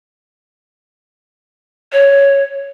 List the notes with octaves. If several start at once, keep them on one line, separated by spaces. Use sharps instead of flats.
C#5